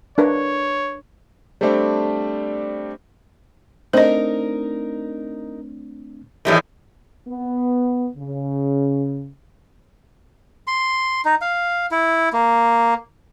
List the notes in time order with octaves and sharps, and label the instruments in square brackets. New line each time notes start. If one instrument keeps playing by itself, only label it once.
[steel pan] D4 A#4 B4 [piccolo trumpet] C#5
[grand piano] G3 A3 C4 D4
[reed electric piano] A3 C4 D4 [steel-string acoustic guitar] D#4 A#4 [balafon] C5 D#5
[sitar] E2 A2 D#3 [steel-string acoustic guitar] E4 G4 E5
[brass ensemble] B3
C#3
[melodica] C6
D#4
F5
E4
A#3